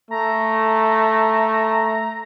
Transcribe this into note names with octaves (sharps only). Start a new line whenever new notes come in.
A3 A#5